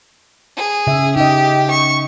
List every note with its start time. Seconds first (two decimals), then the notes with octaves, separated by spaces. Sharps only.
0.57 G#4
0.87 C#3 E5
1.16 D#4 G4 D#5
1.70 C#6